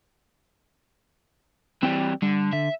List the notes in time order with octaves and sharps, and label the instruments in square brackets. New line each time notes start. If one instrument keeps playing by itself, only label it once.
[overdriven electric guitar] E3 G3 [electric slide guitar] C4 G5
[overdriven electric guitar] D3 [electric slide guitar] G3
[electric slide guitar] D3 [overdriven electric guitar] E5